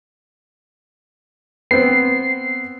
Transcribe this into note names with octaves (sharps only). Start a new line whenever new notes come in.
B3 C4 C7